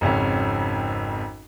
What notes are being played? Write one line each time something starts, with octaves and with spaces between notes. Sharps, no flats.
G#1 F2 C#3 C#4